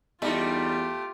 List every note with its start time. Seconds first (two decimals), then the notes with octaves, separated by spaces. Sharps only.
0.22 E2 G3 A3 D#4 F4 G4